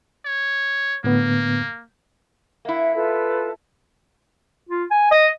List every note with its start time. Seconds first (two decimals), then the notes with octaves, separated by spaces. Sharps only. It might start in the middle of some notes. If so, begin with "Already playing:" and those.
0.25 C#5
1.04 A2 D3 A#3 B3
2.65 A#3 E4 E5 F#5
2.94 F4 A4 B4
4.69 F4
4.91 G#5
5.11 D#5